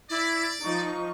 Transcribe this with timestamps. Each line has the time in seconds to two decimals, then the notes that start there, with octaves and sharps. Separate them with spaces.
0.10 E4 D5
0.64 F3 D#4 C#6